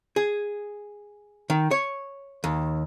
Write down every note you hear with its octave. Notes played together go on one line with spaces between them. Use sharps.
G#4
D#3
C#5
D#2